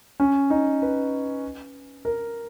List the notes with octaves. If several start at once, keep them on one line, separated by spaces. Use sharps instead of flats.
C#4
D#4
B4
A#4